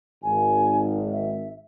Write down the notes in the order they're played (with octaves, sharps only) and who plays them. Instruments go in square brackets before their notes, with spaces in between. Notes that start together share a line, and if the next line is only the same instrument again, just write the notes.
[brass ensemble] G#1 [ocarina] G#5
[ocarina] E5